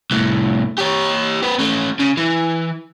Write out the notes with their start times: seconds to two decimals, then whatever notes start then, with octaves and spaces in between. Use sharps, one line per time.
0.11 C2 A2
0.78 G4 C#5
1.43 C4 B4
1.59 A3 C#4
1.99 C#3
2.17 E3